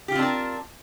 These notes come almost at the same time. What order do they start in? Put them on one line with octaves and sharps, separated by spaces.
G4 F4 C4 D4 A#4